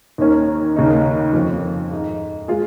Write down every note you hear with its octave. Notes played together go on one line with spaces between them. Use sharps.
D#2 D#3 A#3 C#4
D#2 C#3 A#3 D#4
F2 F3 C#4 F4
G#2 G#3 D#4
G#3 F4 G#4